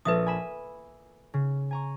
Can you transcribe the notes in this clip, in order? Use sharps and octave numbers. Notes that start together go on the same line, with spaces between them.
A#1 A4 B4 D#5 E5 D#6
G#5 B5 E7
C#3
G#5 A#5 C#6